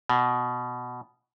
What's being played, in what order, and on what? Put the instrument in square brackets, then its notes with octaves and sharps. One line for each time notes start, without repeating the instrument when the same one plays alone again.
[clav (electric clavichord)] B2